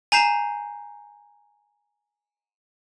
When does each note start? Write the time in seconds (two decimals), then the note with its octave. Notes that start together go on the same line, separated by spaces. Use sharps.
0.12 G#5 A#5 G6 C7 E7